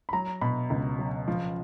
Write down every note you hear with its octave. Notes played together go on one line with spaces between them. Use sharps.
B5
F#3 A#5
B2 B5
C#2
F#3
F3